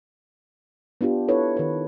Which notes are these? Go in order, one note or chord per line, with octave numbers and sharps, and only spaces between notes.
B3 D4 F4 G4
D4 E4 A4 B4 C#5
D#3 B4